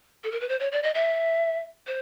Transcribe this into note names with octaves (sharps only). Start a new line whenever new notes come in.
A4
A#4
B4
C5
C#5
D5
D#5
E5
C5